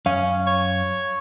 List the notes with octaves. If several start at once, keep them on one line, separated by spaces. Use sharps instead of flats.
F#2 C#4 F5
C#5